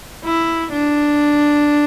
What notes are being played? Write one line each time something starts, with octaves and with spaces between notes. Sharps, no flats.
E4
D4